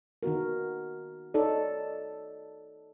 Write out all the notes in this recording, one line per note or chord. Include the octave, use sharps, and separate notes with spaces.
D#3 B3 F#4 A#4
D#4 A4 C#5 D5